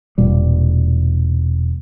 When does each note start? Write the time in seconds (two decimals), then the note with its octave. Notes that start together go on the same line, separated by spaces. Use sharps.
0.18 E1 A#2 G3